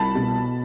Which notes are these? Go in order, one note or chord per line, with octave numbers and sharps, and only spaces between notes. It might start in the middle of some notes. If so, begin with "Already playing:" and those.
Already playing: C2 A5 B5
B2